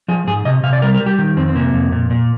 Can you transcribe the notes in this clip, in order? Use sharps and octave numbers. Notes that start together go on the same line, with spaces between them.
F3 G#4
G#2 G#4
C3 D#5
C3 F5
D5
G3 A#4
A#4
G3
G4
D#3
F2 C4
C4
C3 A#3
F2
A#2
A#2